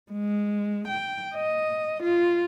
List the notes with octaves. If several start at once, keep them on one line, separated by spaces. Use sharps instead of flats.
G#3
G5
D#5
F4